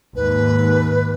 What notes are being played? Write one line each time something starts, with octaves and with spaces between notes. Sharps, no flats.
D#2 G#2 B4